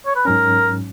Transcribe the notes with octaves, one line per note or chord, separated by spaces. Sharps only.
C#5
B4
G#2 F#3 C#4 A#4